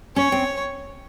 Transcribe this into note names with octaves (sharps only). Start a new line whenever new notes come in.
C#4 C#5
C4